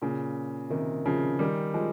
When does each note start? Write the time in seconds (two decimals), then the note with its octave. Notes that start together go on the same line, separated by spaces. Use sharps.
0.02 A#2 C#3
0.70 C3 D#3
1.06 C#3 F3
1.39 D#3 G3
1.74 F3 G#3